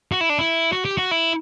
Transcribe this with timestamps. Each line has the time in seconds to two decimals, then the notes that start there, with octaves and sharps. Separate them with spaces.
0.12 F#4
0.21 E4
0.29 D4
0.39 E4
0.72 F#4
0.85 G4
0.98 F#4
1.11 E4